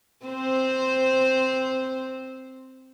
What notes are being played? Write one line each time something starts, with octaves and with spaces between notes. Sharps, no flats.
C4 C5